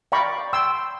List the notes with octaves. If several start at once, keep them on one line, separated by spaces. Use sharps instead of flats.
D5 F5 G5 A#5 B5 C#6
G5 C6 E6